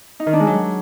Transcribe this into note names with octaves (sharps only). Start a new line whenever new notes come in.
D#4
D#3
D4
G#3
F#3